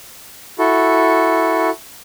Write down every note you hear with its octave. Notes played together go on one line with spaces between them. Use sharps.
E4 F#4 A4